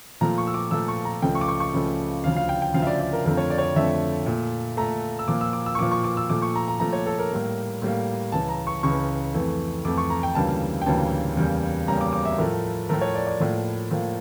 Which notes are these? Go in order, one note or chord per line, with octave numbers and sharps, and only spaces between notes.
A#2 F3 A3 A#5
C#6
E6
D6
A#2 F3 A3 E6
C#6
A#5
C#2 C#3 F3 A3 G5
C#6
D6
C#6
C#6
C#2 C#3 F3 A3
D2 C#3 F3 F5
F5
G5
G5
D2 C#3 F3 F5
E5
D5
D5
A#4
F2 D3 F3 A3 A#4
C#5
D5
C#5
D5
F2 D3 F3 A3 E5
A#2 A3
A#2 A3 A#5
E6
A#2 F3 A#3 D6
E6
D6
E6
C#6
A#2 F3 A#3 D6
C#6
D6
E6
A#2 F3 A3 D6
C#6
A#5
A#5
A#2 F3 A3 A#5
C#5
A4
A#4
A2 G3 A#3
A2 G3 A#3
C#2 C#3 E3 A5
A#5
C#6
C#2 C#3 E3 C#6
F2 E3 A3
F2 E3 A3 D6
C#6
A#5
G5
D2 C#3 E3 G3 A#3 A5
G5
D2 C#3 E3 G3 A#3 A5
E2 C#3 G3 A#3
E2 C#3 G3 A#3 A#5
D6
D6
E5
A2 F3 A3 A#4
A2 F3 A3 A#4
C#5
D5
D5
A2 F3 A#3
A2 F3 A#3